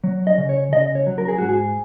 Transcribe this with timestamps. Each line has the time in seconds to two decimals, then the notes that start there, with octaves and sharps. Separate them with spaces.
0.04 F#3
0.27 D#5
0.38 C#3
0.49 C#5
0.72 C#3 D#5
0.95 C#5
1.06 F#3
1.18 A#4
1.28 G#4
1.38 G#2 F#4
1.49 G#4